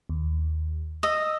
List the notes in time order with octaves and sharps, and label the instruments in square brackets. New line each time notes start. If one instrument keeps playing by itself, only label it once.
[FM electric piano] D#2
[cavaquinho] D#5 [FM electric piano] D#6 E6